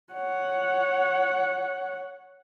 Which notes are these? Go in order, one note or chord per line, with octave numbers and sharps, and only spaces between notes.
C#5 F#5